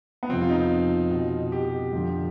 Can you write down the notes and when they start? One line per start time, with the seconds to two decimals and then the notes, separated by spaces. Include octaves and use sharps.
0.23 B3
0.29 F2 C3 F3 C4
0.41 F4
0.50 D#4
1.11 B2
1.52 G4
1.93 F2 D3 F3